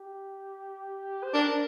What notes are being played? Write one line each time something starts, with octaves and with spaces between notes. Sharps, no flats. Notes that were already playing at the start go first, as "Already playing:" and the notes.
Already playing: G4
C5
D4 A#4